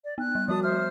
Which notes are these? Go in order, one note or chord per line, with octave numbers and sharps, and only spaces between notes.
D5
B3 F#6
G3
F3 G3 F#4 A5 D#6
C5 E5 F6